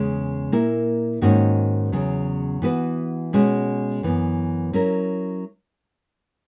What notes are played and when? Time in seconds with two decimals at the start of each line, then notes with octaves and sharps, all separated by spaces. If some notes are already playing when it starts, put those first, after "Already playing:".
Already playing: E2 C#3 G#3
0.52 A#2 A#3 E4 A#4
1.21 G#2 D#3 A#3 C#4 F#4
1.92 E2 C#3 F#3
2.62 E3 B3 F#4 B4
3.33 B2 G#3 C#4 F#4
4.03 F#2 E3 B3
4.73 F#3 C#4 E4 A#4